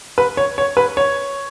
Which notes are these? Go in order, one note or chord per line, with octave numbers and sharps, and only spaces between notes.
B4
C#5
C#5
B4
C#5